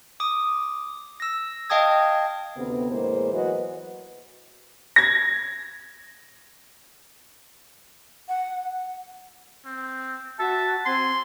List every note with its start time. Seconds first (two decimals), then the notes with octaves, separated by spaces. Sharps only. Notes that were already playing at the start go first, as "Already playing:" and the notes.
0.20 D6 D#6
1.20 E6 A#6
1.70 D#5 F5 G5 A5 D#6 G#6
2.56 D2 C3 B3
2.91 E2 A2 G#3 A#3 B4 C5
3.33 E3 F#3 F#4 B4 D#5
4.96 G#6 A#6
8.28 F#5
9.65 C4
10.39 F#4 E5 A5
10.86 C4 G#5 C6